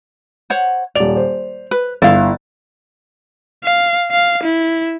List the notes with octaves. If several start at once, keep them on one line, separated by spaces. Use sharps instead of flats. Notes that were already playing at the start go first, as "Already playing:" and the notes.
C5 C#5 F#5
D#1 D5 F7
C5
B4
G1 E4 F5 A6
F5
F5
E4